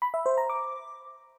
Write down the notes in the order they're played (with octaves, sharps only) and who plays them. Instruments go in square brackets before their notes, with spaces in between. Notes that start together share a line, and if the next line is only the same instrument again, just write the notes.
[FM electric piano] B5
E5
C5
A#5
D6